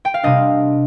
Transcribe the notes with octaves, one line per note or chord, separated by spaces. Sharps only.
G5
F5
C3 G3 A#3 D4 D#5